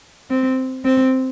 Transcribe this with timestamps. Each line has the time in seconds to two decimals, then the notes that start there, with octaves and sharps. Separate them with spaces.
0.30 C4
0.85 C4